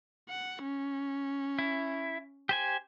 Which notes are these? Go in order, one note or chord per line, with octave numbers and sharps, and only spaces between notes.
F#5
C#4
E4
G4 C5 G#5